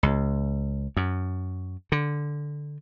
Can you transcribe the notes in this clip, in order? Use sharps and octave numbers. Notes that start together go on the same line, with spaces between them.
C#2
F#2
D3